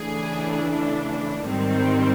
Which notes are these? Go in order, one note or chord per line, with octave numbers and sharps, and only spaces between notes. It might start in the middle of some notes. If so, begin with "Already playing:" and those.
Already playing: C#3 E3 A3 D4 G#4
G#2 D#3 G3 C4